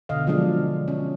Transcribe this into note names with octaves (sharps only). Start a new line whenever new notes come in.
B2 D3 D#5 F5
D3 F3 F#3 G#3 D4
C#4